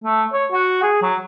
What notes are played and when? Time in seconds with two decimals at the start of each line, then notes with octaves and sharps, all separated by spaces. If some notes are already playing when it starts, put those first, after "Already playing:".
0.04 A3
0.33 C#5
0.52 F#4
0.83 G#4
1.02 F#3